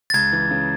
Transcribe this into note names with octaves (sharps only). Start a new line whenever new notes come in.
A6
C#2 G#6
E3
C#3